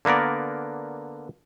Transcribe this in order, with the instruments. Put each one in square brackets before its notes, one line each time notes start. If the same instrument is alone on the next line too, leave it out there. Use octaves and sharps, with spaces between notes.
[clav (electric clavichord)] D3 A#3 B3 A#4 D5